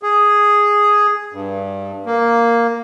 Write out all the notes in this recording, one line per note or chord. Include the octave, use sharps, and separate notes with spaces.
G#4
G2
A#3